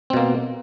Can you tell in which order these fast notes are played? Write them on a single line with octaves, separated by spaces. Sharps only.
C4 B2 A#3